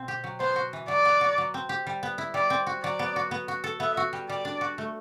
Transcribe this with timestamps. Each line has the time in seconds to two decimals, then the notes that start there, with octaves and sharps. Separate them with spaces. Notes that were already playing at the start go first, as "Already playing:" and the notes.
Already playing: B2 C4
0.08 G4
0.24 F#3
0.40 B3 C5
0.56 F#4
0.73 E3
0.88 F#3 D5
1.05 B3
1.21 F#4
1.38 F#3
1.54 C4
1.69 G4
1.87 G3
2.03 B3
2.18 E4
2.34 G3 D5
2.50 C4
2.67 F#4
2.83 F#3 D5
2.99 B3
3.16 F#4
3.31 B3
3.48 F#4
3.64 A4
3.80 B3 E5
3.97 F#4
4.13 G3
4.29 G3 D5
4.45 D4
4.61 F#4
4.78 A3